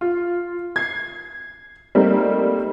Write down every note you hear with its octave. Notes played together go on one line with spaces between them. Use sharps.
F4
G#6 C7
G3 A3 A#3 C4 D#4